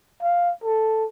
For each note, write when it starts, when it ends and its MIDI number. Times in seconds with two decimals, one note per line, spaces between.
0.23 0.52 77
0.64 1.05 69